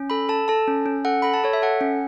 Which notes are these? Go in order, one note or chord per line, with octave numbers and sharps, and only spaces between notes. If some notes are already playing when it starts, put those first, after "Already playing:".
Already playing: C#4
A4 B5
A4 A5
A4 A5
C#4
C#4
A4 F#5
A4 B5
A5
A4 C#5
E5
A4 F#5
C#4